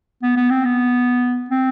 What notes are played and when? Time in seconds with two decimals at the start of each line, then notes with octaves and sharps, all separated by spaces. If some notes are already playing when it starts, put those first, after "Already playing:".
0.23 B3
0.37 B3
0.50 C4
0.65 B3
1.50 C4